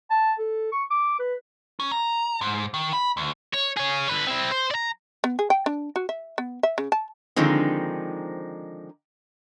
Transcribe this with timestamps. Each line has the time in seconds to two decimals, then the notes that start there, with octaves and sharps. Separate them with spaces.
0.10 A5
0.39 A4
0.72 C#6
0.91 D6
1.19 B4
1.80 C#4
1.92 A#5
2.41 G#2
2.74 D#3
2.93 B5
3.17 D2
3.54 C#5
3.77 G#4 C#5
4.09 D3 B4
4.27 C4 E4
4.51 C5
4.71 D5 A#5
5.24 B3
5.39 G#4
5.50 G5
5.66 D4
5.96 F#4
6.09 E5
6.38 B3
6.63 E5
6.78 C#3
6.92 A5
7.36 D3 D#3 F3 G#3 C4 D#4